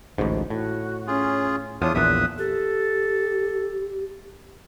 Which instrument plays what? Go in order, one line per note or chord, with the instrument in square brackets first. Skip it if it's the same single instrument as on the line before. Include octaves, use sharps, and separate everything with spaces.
[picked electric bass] A1 D2 G#2
[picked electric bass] A2 [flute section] F#4
[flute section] C#4 [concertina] F4 G#4
[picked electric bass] E2 [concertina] D4 F4 D#6 [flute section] C#5
[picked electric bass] A#1 E2 A#2 [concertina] E5 D#6 [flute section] F#6
[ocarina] G4 [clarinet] A4